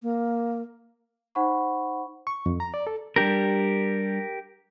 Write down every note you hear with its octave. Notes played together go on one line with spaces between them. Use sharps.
A#3
D#4 C5 F#5 B5 C#6
C#6
F2
A#5
D5
A4
G3 D4 G4 A#4